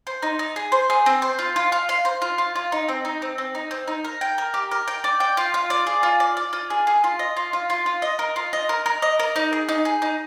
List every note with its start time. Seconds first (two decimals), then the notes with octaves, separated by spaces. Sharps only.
0.07 C5
0.22 D#4
0.39 D#4
0.56 G#4
0.72 C5
0.90 G#4
1.06 C4
1.22 C5
1.39 F4
1.56 F4
1.72 F4
1.89 F5
2.05 C5
2.22 F4
2.38 F4
2.55 F4
2.72 D#4
2.89 C4
3.05 D#4
3.22 C4
3.38 C4
3.55 D#4
3.71 C4
3.88 D#4
4.05 A#4
4.21 G5
4.38 A#4
4.54 G4
4.71 A#4
4.88 G5
5.04 D5
5.20 G5
5.37 F4
5.54 F4
5.70 D5
5.87 G#4
6.03 F4
6.20 D5
6.37 D5
6.53 F4
6.70 G#4
6.87 G#4
7.04 F4
7.19 D#5
7.37 F4
7.53 F4
7.70 F4
7.86 F4
8.02 D#5
8.19 A#4
8.36 F4
8.53 D#5
8.69 A#4
8.86 A#4
9.02 D#5
9.20 A#4
9.36 D#4
9.53 G#4
9.69 D#4
9.85 G#4
10.02 D#4